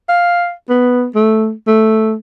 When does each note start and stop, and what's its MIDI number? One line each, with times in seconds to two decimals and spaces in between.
0.09 0.52 77
0.69 1.07 59
1.15 1.52 57
1.67 2.14 57